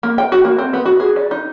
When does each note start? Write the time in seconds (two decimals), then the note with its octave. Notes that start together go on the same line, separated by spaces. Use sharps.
0.03 A#3
0.18 G5
0.32 F#4
0.45 A#3
0.58 C4
0.73 B3
0.86 F#4
1.00 G#4
1.16 D5
1.31 D#4